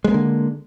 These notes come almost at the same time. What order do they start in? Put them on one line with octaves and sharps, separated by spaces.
G#3 B3 A#3 D3